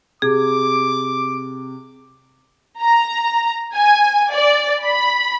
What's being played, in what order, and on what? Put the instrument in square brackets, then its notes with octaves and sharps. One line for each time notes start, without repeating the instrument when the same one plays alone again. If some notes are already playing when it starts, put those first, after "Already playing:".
[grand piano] C3 [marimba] G#4 [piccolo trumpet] D6
[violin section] A#5
G#5
D5
B5